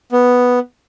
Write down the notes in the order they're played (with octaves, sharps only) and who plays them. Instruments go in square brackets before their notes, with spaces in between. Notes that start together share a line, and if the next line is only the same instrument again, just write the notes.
[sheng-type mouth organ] B3